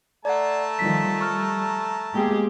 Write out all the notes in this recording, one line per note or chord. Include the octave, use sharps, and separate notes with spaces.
A3 D5 F#5 A5 A#5
D#3 F3 G3 B6
G3 C#6 F6
G#3 A#3 B3 G4 G#4